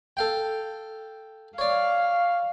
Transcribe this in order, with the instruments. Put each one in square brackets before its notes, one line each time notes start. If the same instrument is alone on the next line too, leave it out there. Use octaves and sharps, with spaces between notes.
[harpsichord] A4 F5 G5
[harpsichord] C#5 D5 [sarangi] F5